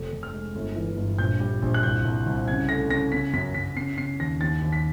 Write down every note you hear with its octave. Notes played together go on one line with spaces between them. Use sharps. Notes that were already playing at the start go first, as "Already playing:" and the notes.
Already playing: F1
F1
F6
G#3
G1
E3
G2
A#1 G6
G3
A#1
F#6
C2 G6
C2
C2
C#3 G#6
A3 A#6
C#3 A#6
C#3 B6
F#2 B6
F#2 B6
C#3 C7
C#3 C7
D#2 A#6
D#2 A6
D#2
B6